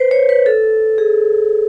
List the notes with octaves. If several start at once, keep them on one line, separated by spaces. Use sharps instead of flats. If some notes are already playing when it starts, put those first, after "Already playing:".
Already playing: B4 C5
C#5
B4
A4
G#4